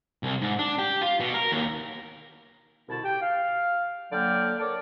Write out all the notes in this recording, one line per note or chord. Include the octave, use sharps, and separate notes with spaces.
C2
G#2
D4
G4
F4
B2
A#4
D#2
C2 B2 D3 E4 A5
G4 G5
F5
D3 F#3 A#3 D5 G5 F6
A4 A#4 C#5 D5